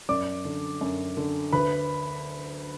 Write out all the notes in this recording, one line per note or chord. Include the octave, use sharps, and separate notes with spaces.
F#2 D5 D6
D3
F#2
D3
D2 B4 B5